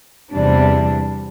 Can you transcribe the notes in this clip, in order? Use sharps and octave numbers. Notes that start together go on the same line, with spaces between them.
E2 C3 E3 G3 D4